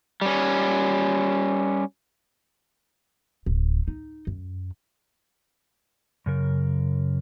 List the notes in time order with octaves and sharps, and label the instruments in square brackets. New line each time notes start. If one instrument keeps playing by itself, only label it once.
[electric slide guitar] G3 C#4
[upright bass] D1
D#4
F#2
[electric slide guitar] F#2 C#3 A#4